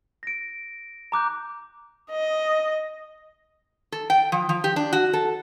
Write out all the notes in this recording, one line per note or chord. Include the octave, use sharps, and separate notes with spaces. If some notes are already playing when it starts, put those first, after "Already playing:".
A#6 D7
A#5 D6 F#6 G6
D#5
A4
G5
F3
F3
G4
D4
F#4
A4